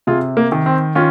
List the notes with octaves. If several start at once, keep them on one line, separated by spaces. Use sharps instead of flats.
C3 F4 G#4
A#3
D#3
C4
D#3 C#4 F4